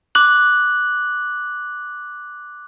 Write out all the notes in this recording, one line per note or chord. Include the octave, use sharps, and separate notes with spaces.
D6 F#6 F#7